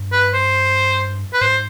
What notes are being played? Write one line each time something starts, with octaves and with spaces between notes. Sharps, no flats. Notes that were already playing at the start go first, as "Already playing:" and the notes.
Already playing: G2
B4
C5
B4
G#2 C5